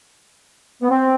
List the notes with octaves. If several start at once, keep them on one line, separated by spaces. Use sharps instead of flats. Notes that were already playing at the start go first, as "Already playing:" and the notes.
B3
C4